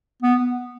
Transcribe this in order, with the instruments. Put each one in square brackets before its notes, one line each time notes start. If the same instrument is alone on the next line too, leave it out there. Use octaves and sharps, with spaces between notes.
[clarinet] B3